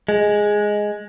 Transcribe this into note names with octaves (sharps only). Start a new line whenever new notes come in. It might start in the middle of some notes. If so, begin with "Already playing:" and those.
G#3